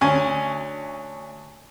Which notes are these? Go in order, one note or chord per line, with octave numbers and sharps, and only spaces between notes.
D2 C#4 G#5